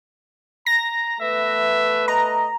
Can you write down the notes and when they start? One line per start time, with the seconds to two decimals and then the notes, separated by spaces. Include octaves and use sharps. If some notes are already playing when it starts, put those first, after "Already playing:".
0.66 A#5 A#6
1.20 A3 B3 B4 E5
2.08 D#5 A#5